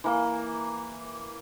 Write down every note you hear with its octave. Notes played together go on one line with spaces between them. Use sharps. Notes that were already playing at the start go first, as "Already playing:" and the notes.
E3 A#3